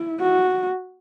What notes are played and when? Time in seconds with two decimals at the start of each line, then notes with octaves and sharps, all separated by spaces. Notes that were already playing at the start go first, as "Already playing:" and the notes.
Already playing: E4
0.20 F#4